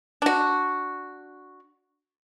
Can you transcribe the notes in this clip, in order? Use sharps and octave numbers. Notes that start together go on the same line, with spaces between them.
D4 F#4